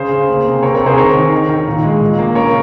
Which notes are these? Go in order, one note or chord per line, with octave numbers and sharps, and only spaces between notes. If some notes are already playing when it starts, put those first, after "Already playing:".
Already playing: C#3 G#4 C5
C#3
A#3
C3
C3 A#4 C#5
A#4 C#5
C3
G#4 C5
D#3 A#4 C#5
D#3
D#3
D#3
A#2
G#3
A#2
A#3
C#3 A#4 C#5